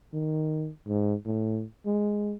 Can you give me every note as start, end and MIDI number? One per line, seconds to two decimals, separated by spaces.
0.13 0.70 51
0.87 1.15 44
1.25 1.64 45
1.86 2.35 56